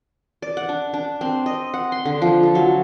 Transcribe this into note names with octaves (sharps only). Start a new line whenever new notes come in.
D5
F#5
D4
D4
C4
D#5
F#5
C6
D3
F3
A4
F#3